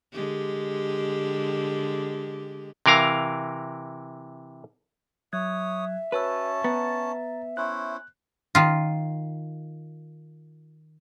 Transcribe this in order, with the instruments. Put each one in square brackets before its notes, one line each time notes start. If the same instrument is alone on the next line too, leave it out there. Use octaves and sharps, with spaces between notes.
[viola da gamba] D3 G#3 G4
[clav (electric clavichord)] C3 E3 A#4 F5 A#5
[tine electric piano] F#3 F#6 G#6 [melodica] C#5 D#6 [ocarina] E5
[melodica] C#4 A5 [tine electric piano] F#4 C#5 E6 [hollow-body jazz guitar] B4
[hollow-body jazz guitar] B3 [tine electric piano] A#5 A6
[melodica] C#4 E4 C5 [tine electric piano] F#6
[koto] D#3 F4